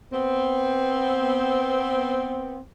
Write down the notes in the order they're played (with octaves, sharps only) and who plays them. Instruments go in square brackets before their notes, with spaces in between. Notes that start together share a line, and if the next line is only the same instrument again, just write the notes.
[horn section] B3 C4